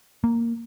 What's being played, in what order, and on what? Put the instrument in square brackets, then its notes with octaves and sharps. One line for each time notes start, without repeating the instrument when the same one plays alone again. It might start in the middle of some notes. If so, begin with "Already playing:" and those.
[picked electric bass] A#3